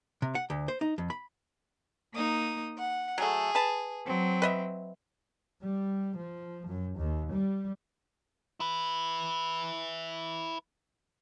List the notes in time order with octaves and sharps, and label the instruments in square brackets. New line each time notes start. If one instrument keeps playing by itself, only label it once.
[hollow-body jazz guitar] C3
F#5
D2
C5
D#4
F2
B5
[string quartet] A#3 D#4 D#6
F#5
[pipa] F#3 A3 [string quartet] G#4
[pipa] B4 A5
[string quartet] F#3 C4
[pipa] B4 D#5 E5
[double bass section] G3
F3
F#2
D#2
G3
[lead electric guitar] E4 B4